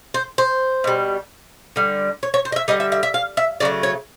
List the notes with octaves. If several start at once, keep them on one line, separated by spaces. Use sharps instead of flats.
C5
C5
B2 G3
D3 G3
C#5
C#5
C5
D#5
E5
D3 G3 D#5
E5
E5
E5
F5
E5
C#3 F#3 A3 D5
C#5